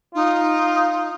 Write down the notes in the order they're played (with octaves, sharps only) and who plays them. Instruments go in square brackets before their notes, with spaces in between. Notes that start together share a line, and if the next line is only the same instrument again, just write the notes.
[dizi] D#4 [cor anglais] F4